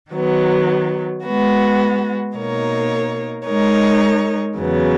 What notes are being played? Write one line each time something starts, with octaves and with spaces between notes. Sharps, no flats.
D#3 F#3 B3
G#3 B3 F#4
B2 A#3 D#4 A#4 C#5
G#3 D#4 A#4 C#5
E2 C#3 F#3 B3